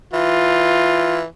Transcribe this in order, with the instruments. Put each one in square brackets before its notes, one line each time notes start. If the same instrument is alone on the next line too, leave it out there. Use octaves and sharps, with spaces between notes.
[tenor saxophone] E3 [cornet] F4